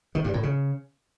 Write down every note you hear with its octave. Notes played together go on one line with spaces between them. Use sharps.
D#3
G2
A2
C#3